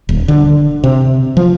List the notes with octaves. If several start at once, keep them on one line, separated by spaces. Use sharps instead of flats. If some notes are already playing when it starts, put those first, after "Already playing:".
D#1
D3
C3
F3